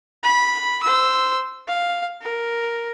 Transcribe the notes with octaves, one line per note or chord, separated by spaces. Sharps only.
B5
C5 E6
F5
A#4